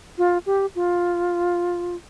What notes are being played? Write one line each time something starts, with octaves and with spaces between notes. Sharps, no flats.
F4
G4
F4